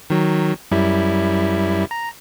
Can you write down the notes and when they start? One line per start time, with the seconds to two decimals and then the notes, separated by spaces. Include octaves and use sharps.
0.10 D#3 F#3
0.71 F#2 G3 E4
1.91 A#5